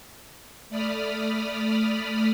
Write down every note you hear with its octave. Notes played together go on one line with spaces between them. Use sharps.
A3 D5 B5 D#6 F6